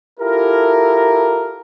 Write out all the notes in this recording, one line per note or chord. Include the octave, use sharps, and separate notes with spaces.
E4 F4 G4 A4 A#4